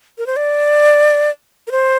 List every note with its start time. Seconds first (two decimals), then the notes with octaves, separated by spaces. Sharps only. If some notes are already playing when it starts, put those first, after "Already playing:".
0.18 A#4
0.26 C5
0.36 D5
1.67 A#4
1.71 C5